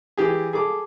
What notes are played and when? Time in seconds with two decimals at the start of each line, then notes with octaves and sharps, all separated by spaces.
0.17 E3 G4 G#4
0.53 G#4 A4 D6